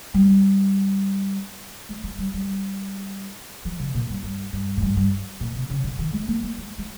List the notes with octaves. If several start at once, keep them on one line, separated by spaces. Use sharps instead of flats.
G3
G#3
G#3
G3
G3
F3
C#3
A#2
G2
G2
G2
G#2
G2
G2
A#2
C3
C#3
C#3
D#3
G#3
A#3
G#3
G#3
G#3